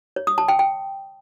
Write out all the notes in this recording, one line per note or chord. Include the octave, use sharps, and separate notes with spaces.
C#5
D#6
A5
G5
G5